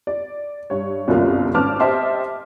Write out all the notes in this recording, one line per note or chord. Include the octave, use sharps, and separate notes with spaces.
D5
G2 C#5
G1 C2 F#2 A#3 F4
G#1 C#4 B4 A5 D6 F6
G4 C5 D#5 E5 A5 C6